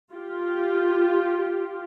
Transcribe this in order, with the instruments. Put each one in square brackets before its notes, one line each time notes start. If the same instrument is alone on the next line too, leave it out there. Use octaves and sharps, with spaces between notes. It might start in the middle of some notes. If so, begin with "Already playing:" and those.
[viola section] F4 G4